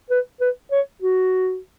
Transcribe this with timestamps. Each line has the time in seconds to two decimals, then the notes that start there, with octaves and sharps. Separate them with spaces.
0.10 B4
0.40 B4
0.71 C#5
1.02 F#4